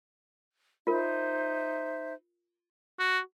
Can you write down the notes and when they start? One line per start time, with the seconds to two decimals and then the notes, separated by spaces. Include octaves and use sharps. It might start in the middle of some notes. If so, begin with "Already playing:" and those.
0.87 D#4 F4 A#4 C5 E5
2.99 F#4